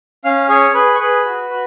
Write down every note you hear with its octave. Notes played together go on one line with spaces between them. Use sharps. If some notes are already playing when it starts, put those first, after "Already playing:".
C#4 F5 F6
G#4 C#5 C#6
G#4 B4 B5
C#6
G#4 B4 B5
F#4
F#4